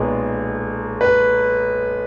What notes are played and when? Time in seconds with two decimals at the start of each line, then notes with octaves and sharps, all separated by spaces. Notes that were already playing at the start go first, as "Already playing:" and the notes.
Already playing: B1 A#2 G#3 B3
1.01 B4